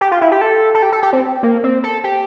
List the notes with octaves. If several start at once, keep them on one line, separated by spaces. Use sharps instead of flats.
G4
F4
E4
G4
A4
A4
G4
A4
G4
C4
A#3
C4
A4
G4